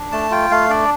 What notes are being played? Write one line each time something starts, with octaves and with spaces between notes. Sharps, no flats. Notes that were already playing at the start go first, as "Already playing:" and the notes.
Already playing: D4
A3 A5
F4 G5
A3 F5
D4 D5